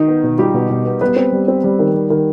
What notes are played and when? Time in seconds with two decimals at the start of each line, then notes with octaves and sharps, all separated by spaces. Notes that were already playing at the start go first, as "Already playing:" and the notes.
Already playing: D#3 D#4
0.08 B3
0.24 B2
0.38 G3 F4 G4
0.54 B2
0.70 B2
0.85 B3
1.01 G3 B3 B4
1.16 C4
1.32 G3
1.48 C4
1.64 G3
1.79 D#3
1.94 G3
2.10 D#3